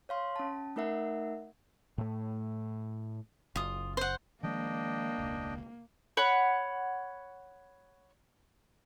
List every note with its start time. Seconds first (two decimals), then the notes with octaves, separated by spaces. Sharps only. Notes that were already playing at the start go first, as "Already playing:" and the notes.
0.09 C#5 F5 C6
0.36 C#4 A5
0.76 A3 D#4 A#4 E5 F#5
1.98 A2 A3
3.56 F#1 F4 D#6
3.97 C5 F#5
4.43 D#3 F3 G#3 A#3 D4 D#5 G5
5.18 E1 C#2
6.17 C#5 F#5 B5